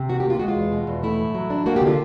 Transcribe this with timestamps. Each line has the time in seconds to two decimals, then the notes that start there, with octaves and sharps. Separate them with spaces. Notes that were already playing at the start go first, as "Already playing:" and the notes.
Already playing: C3
0.09 D#3 F#4
0.20 G4
0.26 A#3 F4
0.39 G#3 F#4
0.48 F4
0.56 E2
0.72 B2
0.87 E2
1.03 A3 E4
1.19 A2
1.35 F#3
1.50 D4
1.66 A#3 F#4
1.76 G4
1.82 D3
1.87 F4